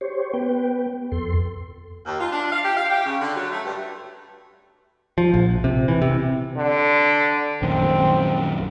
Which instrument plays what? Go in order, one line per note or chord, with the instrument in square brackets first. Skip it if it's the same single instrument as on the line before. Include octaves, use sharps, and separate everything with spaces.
[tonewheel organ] G4 C5 C#5
B3 B4 G5
F2 A4 C6
[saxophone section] D#2
F4
D4
F5
G4
F5
G4
C#3
D3
F#3
A3
G2
[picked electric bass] F3
A#1
C3
E3
C3
[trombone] D3
[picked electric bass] A#1 F#2 D#3 [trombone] C4